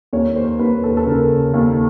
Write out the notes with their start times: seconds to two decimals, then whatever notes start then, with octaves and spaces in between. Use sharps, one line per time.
0.13 D#2 C#5
0.36 C5
0.59 D#2 B4
0.84 A4
0.97 A4
1.06 C#3 A#4
1.54 D#2